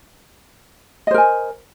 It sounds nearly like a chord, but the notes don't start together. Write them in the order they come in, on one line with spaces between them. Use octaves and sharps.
D#5 C5 A#4 G#5